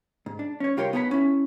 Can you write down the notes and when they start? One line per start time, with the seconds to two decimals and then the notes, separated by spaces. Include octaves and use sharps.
0.26 G#2
0.39 D4
0.60 C#4 C#5
0.77 C2 F4 G4 A#4 C#5 C6
0.93 B3 D#4 C#5 F#5 G5 B5
1.11 C#4 E4